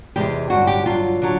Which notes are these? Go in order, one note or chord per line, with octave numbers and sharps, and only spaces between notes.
E2 C3 E3 G#3 G4
G2 D3 F#3 F#4
G4
G2 D3 F#3 F4
D3 F#3